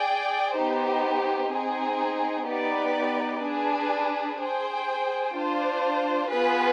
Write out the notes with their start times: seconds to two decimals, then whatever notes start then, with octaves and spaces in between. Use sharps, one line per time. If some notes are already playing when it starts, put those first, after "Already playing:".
Already playing: G#4 D5 G5
0.56 B3 D#4 G4 C5
1.51 C4 D#4 G#4
2.47 B3 D#4 G4 B4 D5
3.43 D4 G#4 B4
4.38 G#4 C5 G5
5.34 D4 F4 C5
6.30 B3 F4 G#4 B4